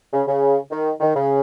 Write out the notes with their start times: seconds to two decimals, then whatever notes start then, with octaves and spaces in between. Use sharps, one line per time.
0.13 C#3
0.26 C#3
0.70 D#3
1.01 D#3
1.15 C#3